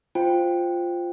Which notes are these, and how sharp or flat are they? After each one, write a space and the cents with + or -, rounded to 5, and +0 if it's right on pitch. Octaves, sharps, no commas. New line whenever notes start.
F4 +0 C5 +0 G5 +0